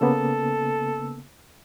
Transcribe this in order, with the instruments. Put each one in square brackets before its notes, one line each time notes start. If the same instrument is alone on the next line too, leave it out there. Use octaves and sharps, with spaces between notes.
[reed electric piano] C#3 A#3 B3 [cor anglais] A4